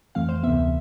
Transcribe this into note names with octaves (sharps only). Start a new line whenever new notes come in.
F2 E3 A3 C4 F5
C5
D2 C3 E3 B3 E5